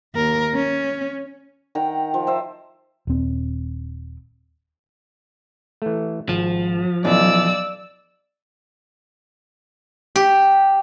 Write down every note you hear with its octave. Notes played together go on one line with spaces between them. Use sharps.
D#2 A#4
C#4
D#3 F#5 G5 A#5
F3
C5 E5
D#1 C4
E3 A3
G#1 F3
B1 E3 C#4 D5 E6
G4